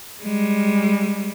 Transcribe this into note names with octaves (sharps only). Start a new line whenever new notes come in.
G3 G#3